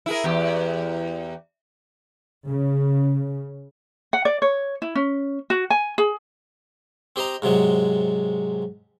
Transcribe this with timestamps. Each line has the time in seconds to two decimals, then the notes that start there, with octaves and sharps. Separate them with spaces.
0.06 E4 G#4 A#4
0.24 E2 G4
2.46 C#3
4.13 F#5
4.25 D5
4.42 C#5
4.82 E4
4.95 C#4
5.50 F#4
5.70 G#5
5.98 G#4
7.16 C4 G4 C5 D#5 A#5
7.42 G#2 C3 F#3 G#3